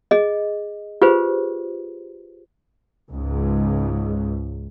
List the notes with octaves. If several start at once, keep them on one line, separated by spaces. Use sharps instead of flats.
G#4 D#5
F4 G4 G#4 B4 C5
C#2 G#2